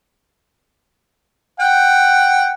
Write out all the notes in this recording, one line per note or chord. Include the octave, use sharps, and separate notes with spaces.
F#5 G5